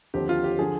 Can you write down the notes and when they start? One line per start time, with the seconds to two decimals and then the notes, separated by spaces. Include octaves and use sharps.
0.14 D#2 D3 F3 C4 G4
0.29 F4
0.44 G4
0.59 D3 F3 G#4